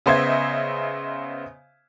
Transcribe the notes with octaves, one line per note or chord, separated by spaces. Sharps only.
C#3 B3 C5 D#5 E5 G#6